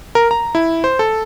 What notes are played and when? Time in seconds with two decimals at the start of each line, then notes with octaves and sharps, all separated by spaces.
0.15 A#4
0.31 A#5
0.55 E4
0.84 C5
0.99 A4